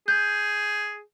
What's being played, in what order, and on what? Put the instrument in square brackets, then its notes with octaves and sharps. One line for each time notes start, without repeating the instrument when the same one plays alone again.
[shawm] G#4 [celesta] G6